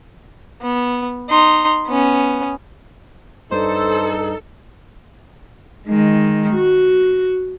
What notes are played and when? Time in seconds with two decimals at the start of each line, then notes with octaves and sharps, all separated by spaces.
0.62 B3
1.30 D#4 C6
1.87 B3 C#4
3.52 G2 D#4 A4 C5
5.87 D#3 G#3
6.54 F#4